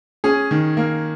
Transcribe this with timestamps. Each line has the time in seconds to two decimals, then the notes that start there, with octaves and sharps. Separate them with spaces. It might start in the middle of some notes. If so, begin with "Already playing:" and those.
0.24 C#4 G#4
0.51 D#3
0.77 A#3